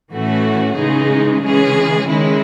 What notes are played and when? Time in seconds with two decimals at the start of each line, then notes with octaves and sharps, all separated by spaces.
0.12 A2 E3 A3 C#4 F#4
0.77 C#3 E3 G#3 D#4 G#4
1.43 C#3 E3 G#3 C#4 G#4
2.08 D#3 G#3 C#4 E4